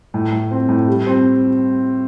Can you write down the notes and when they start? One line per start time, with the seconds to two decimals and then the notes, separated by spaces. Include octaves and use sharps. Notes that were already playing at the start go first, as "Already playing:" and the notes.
0.14 A2
0.32 A2
0.51 C4
0.69 A2
0.88 G3
1.06 C4